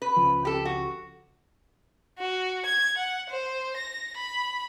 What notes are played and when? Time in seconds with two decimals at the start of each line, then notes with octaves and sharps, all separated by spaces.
0.02 B4
0.16 C#2 C#3 F3
0.45 G4 A4
0.65 F#4
2.18 F#4
2.65 G#6
2.97 F#5
3.30 C5
3.77 A#6
4.16 B5